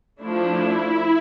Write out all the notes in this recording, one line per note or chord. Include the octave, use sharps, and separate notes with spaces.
F3 A3 D4 E4